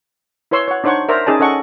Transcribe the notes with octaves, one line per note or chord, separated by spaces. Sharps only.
E4 B4 C#5 C6 E6
C#5 F#5
D4 D#4 C5 C#5 F#5 C#6
A#4 C5 D5 E5 A#5
C#4 D#4 G#4 D5 A5
C#4 A4 D#5 F#5 C#6